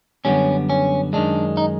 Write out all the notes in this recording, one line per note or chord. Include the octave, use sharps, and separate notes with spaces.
F#2 D3 G3 B3 C#4
C#4
F#2 D#3 G#3 D4
D#4